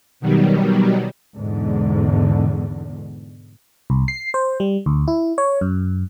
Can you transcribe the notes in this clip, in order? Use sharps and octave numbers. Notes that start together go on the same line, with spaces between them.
B2 D#3 F#3 G3
E2 G#2 B2 D3
C2
C7
C5
G3
D2
E4
C#5
F#2